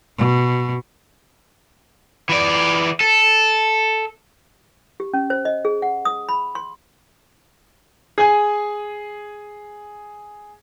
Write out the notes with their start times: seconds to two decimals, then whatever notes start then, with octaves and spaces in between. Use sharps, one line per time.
0.18 B2
2.29 E3 D5
3.00 A4
5.00 G4
5.14 C#4
5.30 C5
5.45 D#5
5.65 G#4
5.82 F#5
6.05 D#6
6.29 B5
6.55 C6
8.18 G#4 G#5